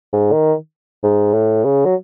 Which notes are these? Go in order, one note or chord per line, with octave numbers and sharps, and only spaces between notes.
G#2
D#3
G#2
A2
C#3
F#3